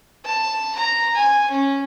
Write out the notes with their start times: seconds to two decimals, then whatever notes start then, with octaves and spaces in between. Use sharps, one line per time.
0.25 A5
0.76 A#5
1.15 G#5
1.51 C#4